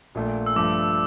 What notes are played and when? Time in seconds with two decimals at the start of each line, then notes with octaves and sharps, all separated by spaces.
0.15 A#1 A#2 A3
0.46 E6
0.56 G2 F3 A3 D6